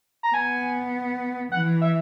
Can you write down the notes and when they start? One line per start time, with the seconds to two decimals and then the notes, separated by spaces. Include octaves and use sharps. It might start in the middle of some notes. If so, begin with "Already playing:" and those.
0.23 A#5
0.34 B3 G#5
1.52 E3 F#5
1.81 E5